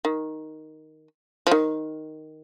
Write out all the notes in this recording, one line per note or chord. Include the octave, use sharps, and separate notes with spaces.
D#3
F3
D#3